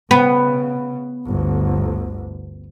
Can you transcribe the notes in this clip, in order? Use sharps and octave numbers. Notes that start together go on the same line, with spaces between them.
C#3 B3
G1 D2